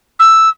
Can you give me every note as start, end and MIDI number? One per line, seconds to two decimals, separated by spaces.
0.19 0.49 88